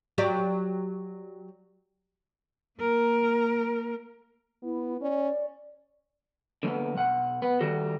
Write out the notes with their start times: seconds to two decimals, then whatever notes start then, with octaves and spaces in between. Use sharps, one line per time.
0.18 F#3 G4 D5
2.79 A#3 A#4
4.63 B3 E4
5.01 C#4 D5
6.63 D3 F#3 A#3 B3
6.96 B1 F#5
7.42 B3
7.60 D#3 G3 F#4 A4